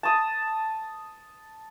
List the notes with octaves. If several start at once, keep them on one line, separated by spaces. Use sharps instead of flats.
A5 D#6